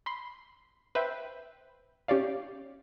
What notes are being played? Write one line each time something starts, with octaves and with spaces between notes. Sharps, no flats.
B5 C6
B4 C5 E5 G5
C#4 G4 C#5 D5 F5